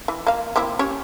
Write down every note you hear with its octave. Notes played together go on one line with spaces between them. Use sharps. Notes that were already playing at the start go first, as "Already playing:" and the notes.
E3
A#3 F5
A#3 C4 E4
C#4 G4 C#5